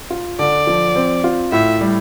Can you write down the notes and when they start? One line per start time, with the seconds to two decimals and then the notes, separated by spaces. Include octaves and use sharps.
0.10 F4
0.39 D3 D5
0.67 F3
0.96 C4
1.24 F4
1.52 A2 E5
1.81 G3